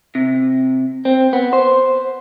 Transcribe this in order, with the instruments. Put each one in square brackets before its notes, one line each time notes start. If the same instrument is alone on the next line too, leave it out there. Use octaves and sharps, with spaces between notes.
[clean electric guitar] C3
C4
B3
C5